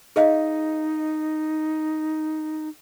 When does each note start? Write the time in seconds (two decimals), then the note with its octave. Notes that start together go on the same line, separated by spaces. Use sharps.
0.16 D#4 G#4 D#5 F5